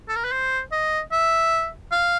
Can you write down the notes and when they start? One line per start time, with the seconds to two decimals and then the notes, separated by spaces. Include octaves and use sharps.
0.08 A4
0.16 A#4
0.24 B4
0.32 C5
0.72 D#5
1.12 E5
1.92 F5